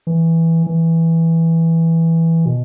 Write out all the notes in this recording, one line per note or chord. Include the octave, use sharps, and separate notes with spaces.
E3
E3
B2